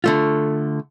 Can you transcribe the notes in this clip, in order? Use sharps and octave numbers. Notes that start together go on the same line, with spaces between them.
D3 A3 F4